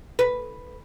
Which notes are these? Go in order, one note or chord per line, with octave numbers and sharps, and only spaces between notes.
B4